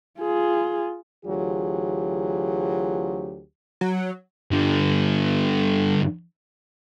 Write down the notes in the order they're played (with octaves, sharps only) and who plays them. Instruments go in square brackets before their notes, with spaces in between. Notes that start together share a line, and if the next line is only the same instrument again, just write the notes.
[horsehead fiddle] F4 G#4
[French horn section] D2 E3 F#3 F4 G4 G#4
[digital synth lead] F#3
[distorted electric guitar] G2 D3